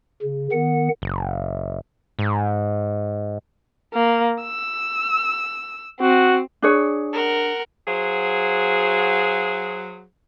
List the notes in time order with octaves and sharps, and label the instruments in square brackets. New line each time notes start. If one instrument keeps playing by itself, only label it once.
[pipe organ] C#3
D#3 B3 F#5
[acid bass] F#1
G#2
[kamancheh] A#3
E6
[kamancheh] C4 [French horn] F#4
[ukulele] D4 G#4 C#5
[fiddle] A#4 F#5
[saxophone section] F#3 F#4 G#4 C5 F5